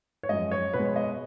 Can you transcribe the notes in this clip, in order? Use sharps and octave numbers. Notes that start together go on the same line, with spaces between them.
C#5
F#2 F3 G#3 D#5
C#5
B2 G#3 B4
C#5
D#5